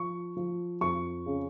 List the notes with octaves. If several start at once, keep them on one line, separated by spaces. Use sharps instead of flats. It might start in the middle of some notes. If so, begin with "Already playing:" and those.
Already playing: F3 C#6
F3
F2 C#6
C#3